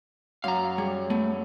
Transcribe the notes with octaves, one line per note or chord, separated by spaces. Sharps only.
F#2 F#3 F5 A#5
G3 G#4
A3 B3